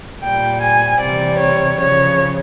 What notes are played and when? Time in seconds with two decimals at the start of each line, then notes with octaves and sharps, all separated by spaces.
0.22 A#2 G3 G5
0.61 G#5
1.01 C3 E3 G3 D5
1.39 C#5
1.79 C#3 F3 C#5